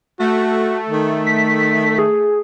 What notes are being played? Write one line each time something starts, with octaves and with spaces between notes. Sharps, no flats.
A3 F#4
D#3
B6
G#4